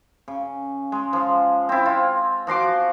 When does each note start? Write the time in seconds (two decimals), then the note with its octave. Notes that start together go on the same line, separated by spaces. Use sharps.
0.28 C#3
0.92 G#3
1.13 F3
1.69 C4 E4
1.86 F4
2.47 F3 F#4 C6 D6